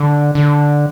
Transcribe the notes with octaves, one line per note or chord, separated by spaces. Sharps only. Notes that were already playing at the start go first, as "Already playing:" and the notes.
Already playing: D3
D3